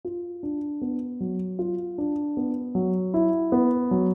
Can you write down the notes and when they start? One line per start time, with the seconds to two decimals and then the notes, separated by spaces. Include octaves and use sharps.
0.05 F4
0.43 D4
0.82 B3
1.20 F#3
1.59 F4
1.98 D4
2.37 B3
2.75 F#3
3.14 E4
3.52 B3
3.91 F#3